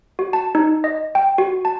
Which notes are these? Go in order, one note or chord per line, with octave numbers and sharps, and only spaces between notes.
F#4
A5
D#4
D#5
G5
F#4
A5